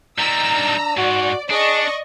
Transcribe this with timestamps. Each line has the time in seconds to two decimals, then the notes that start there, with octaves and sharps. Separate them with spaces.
0.18 D#3 G3 A#5 E6
0.54 D4
0.97 G#2 F#4 D5
1.50 D4 G#4 D5 D#5 C#6